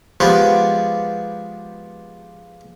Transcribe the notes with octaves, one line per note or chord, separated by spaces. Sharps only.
F3 G#3 B3 D4 G4